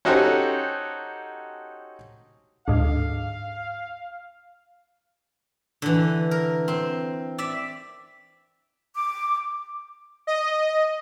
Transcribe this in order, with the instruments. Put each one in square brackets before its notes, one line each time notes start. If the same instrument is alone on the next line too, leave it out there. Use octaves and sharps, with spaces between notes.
[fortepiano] C#4 D#4 F#4 G4 A4 C5
[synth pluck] D2 G#2 [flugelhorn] F5
[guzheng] D3 E3
A#4
C4
D5 E5
[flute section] D6
[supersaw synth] D#5